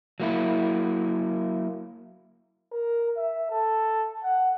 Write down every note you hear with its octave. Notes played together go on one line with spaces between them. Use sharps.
F#3 A#3 E4
A#4
E5
A4
F#5